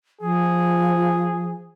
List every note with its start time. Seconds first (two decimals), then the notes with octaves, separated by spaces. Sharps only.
0.21 F3 G#4